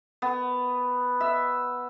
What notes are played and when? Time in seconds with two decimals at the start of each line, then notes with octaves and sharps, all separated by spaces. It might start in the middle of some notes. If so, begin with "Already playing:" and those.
0.22 B3
1.20 E5